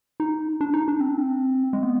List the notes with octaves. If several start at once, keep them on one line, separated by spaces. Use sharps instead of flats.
D#4
D4
D#4
D4
C4
D4
C4
G#3
B3